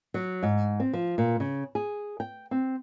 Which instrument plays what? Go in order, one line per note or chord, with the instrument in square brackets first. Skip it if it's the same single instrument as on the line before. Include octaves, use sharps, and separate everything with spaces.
[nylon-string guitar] F#3
G#2
C4
F3
A#2
C#3
G#4
G5
C4